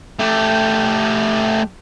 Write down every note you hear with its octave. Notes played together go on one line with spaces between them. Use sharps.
A3 G4